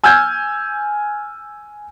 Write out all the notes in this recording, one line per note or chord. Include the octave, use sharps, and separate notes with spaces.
G#5 E6 F6 G6 G#6